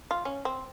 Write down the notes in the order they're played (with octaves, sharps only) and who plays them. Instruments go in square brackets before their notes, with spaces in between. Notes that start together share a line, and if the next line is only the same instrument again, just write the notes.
[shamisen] F4
C#4
C4